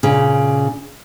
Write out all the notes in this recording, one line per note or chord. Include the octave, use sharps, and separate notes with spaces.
A#2 C#3